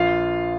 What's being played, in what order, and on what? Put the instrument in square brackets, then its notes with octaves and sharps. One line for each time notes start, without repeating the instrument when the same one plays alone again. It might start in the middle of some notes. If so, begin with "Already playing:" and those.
Already playing: [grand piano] A#1 F4 F5